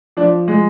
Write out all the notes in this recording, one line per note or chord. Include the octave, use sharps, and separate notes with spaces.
F3 D4
G#3